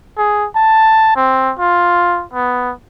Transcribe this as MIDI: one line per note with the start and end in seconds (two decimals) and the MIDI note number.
0.18 0.47 68
0.56 1.14 81
1.16 1.53 60
1.59 2.24 65
2.33 2.72 59